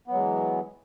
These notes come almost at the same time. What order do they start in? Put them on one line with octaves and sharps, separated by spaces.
B3 F#3 G#3 E3